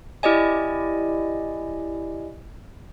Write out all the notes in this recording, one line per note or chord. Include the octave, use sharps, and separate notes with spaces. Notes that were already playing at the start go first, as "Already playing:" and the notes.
E4 G4 D5 D#5 G#5